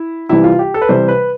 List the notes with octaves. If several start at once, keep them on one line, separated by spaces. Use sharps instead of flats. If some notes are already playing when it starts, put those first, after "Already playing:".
Already playing: E4
C3 E3 G3 E4
F4
G4
A4
B4
C3 E3 G3 C5
B4